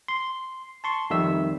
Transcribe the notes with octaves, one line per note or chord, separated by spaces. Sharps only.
C6
A5 C6 C#6
F2 D#3 G3 E5 E6